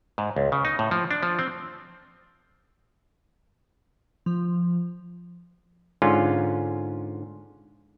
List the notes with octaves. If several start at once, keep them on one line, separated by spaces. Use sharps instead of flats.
G#2
C#2
C#3
D#4
A2
F3
D4
F3
C4
F3
G#2 D3 C#4 F4